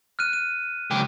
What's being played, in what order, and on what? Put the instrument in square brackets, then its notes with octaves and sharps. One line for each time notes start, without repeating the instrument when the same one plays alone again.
[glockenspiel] F6 F#6 D#7
D#7
[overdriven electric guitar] C#2 G4